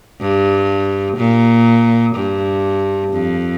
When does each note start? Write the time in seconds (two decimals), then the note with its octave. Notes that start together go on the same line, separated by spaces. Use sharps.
0.21 G2
1.17 A#2
2.15 G2
3.12 F2